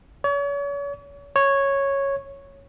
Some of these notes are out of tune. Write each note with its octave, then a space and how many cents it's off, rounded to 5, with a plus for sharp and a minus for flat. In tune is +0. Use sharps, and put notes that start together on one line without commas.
C#5 +40
C#5 -5